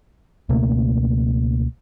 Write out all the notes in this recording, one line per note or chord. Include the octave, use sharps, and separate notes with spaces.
C#2 B2 A3 A#3